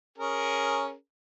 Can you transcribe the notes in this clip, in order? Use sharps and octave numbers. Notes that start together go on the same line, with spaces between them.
C#4 G#4 A#4